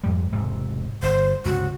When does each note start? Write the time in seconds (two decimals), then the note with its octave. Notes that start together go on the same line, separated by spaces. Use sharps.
0.04 F2 G#2 G3
0.32 E1 G#2 C3
1.03 G1 C5
1.45 C#2 G2 C3 F#4